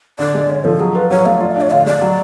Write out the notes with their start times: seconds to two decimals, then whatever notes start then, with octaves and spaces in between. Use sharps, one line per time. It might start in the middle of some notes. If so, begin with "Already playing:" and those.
0.19 D3 D5
0.34 G#3
0.49 D3 C#5
0.65 F3 A4
0.80 F#3 G#4
0.95 F4 B4
1.10 F#3 C#5
1.25 A3 F5
1.40 F4 D5
1.51 D4 F5
1.61 C#5
1.71 D3 F5
1.86 G#3 D5
2.01 F#3